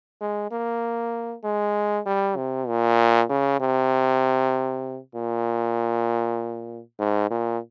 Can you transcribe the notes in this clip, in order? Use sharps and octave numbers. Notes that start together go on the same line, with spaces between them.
G#3
A#3
G#3
G3
C3
A#2
C#3
C3
A#2
G#2
A#2